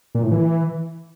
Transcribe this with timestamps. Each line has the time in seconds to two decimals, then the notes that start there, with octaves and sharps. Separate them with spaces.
0.15 A#2
0.23 A2
0.32 E3